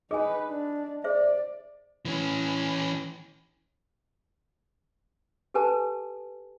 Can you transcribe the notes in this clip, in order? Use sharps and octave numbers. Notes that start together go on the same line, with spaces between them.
D#4 G#4 B4 D#5 G#5
D4
G#4 C5 D5 E5
E3 C#4
G4 A4 B4 G#5 A5